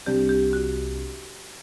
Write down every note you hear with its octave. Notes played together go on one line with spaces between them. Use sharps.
C2 C3 G3 D4 G4
G4
F#4